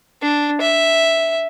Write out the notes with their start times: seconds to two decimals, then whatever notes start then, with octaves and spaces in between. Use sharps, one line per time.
0.22 D4
0.61 E5